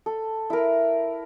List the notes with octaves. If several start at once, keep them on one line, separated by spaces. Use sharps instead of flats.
A4
E4 A#4